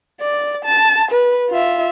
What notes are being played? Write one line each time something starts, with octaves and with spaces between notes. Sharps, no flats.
D5
A5
B4
F4 E5